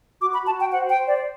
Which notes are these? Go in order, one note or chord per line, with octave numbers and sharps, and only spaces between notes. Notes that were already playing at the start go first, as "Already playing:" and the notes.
F#4 D6
B5
F#4 A5
G5
C5 F#5
G5
C5
D5